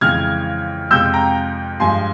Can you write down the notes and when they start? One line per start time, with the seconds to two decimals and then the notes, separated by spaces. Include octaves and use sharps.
0.01 F2 C#3 E3 G#3 F6 G#6
0.91 F2 C3 F3 G#3 E6 G6
1.14 G5 A#5
1.80 G2 F3 G#3 G#5 C6